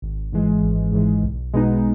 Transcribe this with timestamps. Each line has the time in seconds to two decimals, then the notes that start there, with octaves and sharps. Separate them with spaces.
0.02 G#1
0.32 G#2 E3 G#3
0.63 G#1
0.92 G#2 E3 G#3
1.23 B1
1.53 B2 G#3 B3 D#4